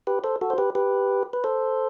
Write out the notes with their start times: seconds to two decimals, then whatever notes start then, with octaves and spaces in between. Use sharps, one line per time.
0.07 G4 B4
0.24 A4 C5
0.41 F#4 A4
0.50 C5
0.58 G4 B4
0.75 G4 B4
1.33 B4
1.44 A4 C5